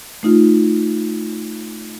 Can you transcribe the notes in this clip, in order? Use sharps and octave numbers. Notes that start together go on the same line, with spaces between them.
A3 D#4 F4